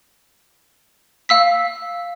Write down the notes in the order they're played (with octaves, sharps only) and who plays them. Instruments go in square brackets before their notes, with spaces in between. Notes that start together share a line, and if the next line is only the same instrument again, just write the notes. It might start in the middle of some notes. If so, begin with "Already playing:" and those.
[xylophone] F5 E6 B6